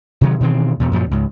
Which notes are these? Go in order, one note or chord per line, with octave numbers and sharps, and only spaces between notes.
C3 D#3 E3 F#3
B2 D#3 E3 C4
E2 B2
F#2 A#2 F3 F#3
C#2 G#2